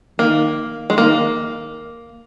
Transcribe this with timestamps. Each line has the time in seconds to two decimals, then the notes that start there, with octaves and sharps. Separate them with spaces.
0.19 D#3 A#3
0.90 G#3
0.98 D#3 A#3